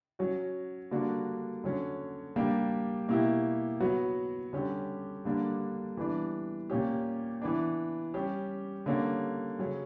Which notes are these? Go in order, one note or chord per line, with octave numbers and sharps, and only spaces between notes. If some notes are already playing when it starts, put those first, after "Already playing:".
F#3 C#4 F#4
D3 G3 A#3 D4 F#4
D3 F#3 C#4
G3 A#3 D4 G4
B2 A#3 E4 G4
F#3 B3 F#4
D3 G3 C#4 G4
D3 G3 A#3 D4
E3 G3 B3 D4
A#2 A#3 C#4 G4
E3 B3 D4
G3 C#4 G4
D3 G3 A#3 C#4
C#3 F#3 C#4